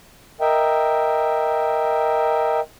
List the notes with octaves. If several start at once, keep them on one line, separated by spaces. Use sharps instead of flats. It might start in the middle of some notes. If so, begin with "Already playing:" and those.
A#4 D#5 E5 G5